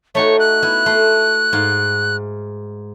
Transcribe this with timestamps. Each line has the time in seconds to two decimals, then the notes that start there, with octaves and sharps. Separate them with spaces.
0.15 A3 D#4 F#4 C#5
0.40 F#6
0.62 B3 E4
0.86 A3 C6
1.53 G#2 F5 F#5